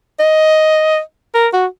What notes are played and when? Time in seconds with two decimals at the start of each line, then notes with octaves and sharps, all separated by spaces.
0.20 D#5
1.35 A#4
1.53 F#4